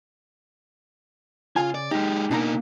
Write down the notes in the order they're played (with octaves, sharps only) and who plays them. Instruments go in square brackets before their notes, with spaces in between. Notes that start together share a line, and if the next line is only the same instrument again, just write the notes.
[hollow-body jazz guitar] C#3 G#5 [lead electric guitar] F4
[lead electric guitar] D5
[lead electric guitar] G#3 G4 [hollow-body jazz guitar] D#4
[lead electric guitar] B2 A#3 [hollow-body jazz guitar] D4 D#4 A#5